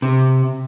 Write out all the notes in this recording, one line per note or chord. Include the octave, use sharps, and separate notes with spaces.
C3